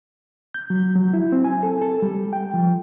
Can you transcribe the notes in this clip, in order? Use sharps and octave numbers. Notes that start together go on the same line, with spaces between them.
G6
F#3
F#3
E4
C4
G#5
A4
A4
G3
G5
F3